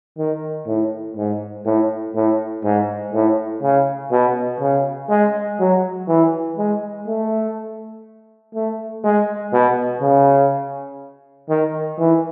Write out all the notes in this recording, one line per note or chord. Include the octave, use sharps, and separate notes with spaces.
D#3
A2
G#2
A2
A2
G#2
A2
C#3
B2
C#3
G#3
F#3
E3
G#3
A3
A3
G#3
B2
C#3
D#3
E3